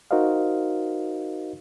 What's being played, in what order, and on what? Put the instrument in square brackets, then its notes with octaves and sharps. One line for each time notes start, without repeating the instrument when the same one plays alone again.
[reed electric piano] D#4 F#4 A#4 C5 D#5 F5